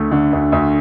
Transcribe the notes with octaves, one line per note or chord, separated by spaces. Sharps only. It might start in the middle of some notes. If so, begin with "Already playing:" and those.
Already playing: D2 D3 A3
D3
D2
D2